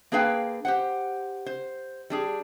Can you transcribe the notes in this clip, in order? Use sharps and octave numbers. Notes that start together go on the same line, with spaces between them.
A#3 D4 G#4 B4 F5 G5
G4 C5 F#5
C5
G3 D4 G#4